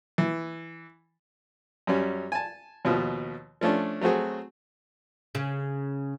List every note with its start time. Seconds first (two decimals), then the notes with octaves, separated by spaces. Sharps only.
0.18 E3
1.87 F#2 G3 C#4
2.32 G#5 A5
2.85 D#2 B2 F3
3.61 F3 A3 C#4 D4
4.01 F#3 A3 C4 F#4 G#4
5.35 C#3